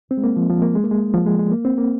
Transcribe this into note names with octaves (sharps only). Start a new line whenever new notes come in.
C4
G#3
A#3
F3
F3
A#3
G#3
A#3
G#3
F3
G#3
G#3
A#3
C4
A#3